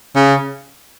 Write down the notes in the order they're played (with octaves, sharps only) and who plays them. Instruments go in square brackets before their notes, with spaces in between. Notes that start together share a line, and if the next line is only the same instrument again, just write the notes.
[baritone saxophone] C#3